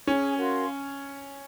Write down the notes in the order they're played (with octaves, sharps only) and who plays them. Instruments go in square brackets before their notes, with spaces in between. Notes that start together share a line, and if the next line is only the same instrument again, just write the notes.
[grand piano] C#4 [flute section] G#4 C#5 G#5
[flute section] F#4 A#4 F5 C6